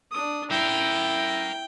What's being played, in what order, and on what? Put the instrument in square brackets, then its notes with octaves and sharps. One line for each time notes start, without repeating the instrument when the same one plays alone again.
[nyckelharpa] D4 D#6
[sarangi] E4 [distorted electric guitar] A#4 E5 [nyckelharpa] G5